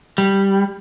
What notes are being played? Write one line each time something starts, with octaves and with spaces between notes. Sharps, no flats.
G3